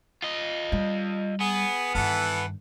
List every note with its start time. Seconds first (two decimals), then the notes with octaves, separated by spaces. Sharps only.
0.22 F4 D#5
0.72 G3
1.41 B3 G#4
1.95 G2 D#3 E3 A4 F#5